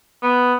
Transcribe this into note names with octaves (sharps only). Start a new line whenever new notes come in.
B3